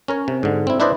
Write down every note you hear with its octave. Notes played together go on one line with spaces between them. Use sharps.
C#4 A#4 C#5
C3
G#2 D3
C4 E4
D4 E4 B4 C5 D5 D#5